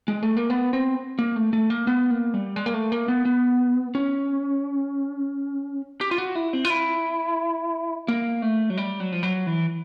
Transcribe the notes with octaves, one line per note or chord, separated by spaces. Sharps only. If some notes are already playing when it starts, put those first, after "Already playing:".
G#3
A3
A#3
B3
C4
A#3
A3
A3
A#3
B3
A#3
G3
G#3
A#3
A3
A#3
B3
B3
C#4
G4
F4
F#4
E4
C4
F4
E4
A#3
A3
F#3
G3
F#3
F3
F#3
E3